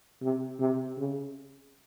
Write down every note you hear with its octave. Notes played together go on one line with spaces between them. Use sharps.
C3
C3
C#3